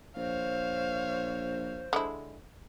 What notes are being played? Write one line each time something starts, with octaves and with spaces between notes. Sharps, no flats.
A#1 C5 C#5 F5
D3 G#3 E4